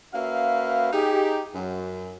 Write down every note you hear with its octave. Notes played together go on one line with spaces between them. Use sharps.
A#3 C#4 F#4 B4 E5 F5
D#4 G4 G#4
F#2